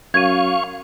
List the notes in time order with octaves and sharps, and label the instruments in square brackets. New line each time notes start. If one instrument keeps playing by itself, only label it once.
[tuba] F#2 [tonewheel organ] F5 C#6 [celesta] G#6 D#7